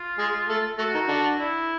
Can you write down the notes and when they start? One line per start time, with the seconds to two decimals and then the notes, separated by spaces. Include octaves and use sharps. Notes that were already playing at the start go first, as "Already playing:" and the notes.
Already playing: F4
0.18 G#3 G#4
0.48 A3 A4
0.78 A3 F#4 A4
0.94 D#3 D#4
1.08 D3 D4
1.39 E4